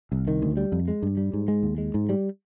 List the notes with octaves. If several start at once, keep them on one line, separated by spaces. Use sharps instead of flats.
C2
D#3
D2
G3
F2
G#3
G2
G3
G#2
G#3
D#2
G#3
G#2
G3